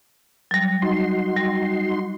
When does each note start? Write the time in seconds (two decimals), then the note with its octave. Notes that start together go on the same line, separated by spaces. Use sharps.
0.51 F#3 G3
0.82 D#4 F#4 C6
1.37 G3